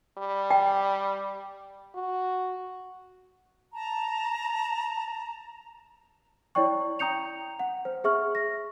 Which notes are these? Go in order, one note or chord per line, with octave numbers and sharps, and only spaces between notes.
G3
G5
F#4
A5 A#5
E4 C#5 D5 G5 C#6
G5 A#5 D#6 G6 C#7 F7
F#5
C5
G#4 E5 C#6 F6
A#6